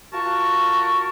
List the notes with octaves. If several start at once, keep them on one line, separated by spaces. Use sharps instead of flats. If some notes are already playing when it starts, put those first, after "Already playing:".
F4 F#4 A#4 A5 C#6